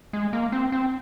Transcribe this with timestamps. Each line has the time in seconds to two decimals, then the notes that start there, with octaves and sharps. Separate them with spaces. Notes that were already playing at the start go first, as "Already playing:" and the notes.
0.13 G#3
0.33 A#3
0.52 C4
0.72 C4